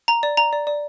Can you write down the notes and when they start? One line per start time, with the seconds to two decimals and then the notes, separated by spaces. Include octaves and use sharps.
0.08 A#5
0.23 D5
0.37 A#5
0.53 D5
0.67 D5